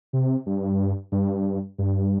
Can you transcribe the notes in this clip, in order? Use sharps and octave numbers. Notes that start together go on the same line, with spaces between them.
C3
G2
G2
G2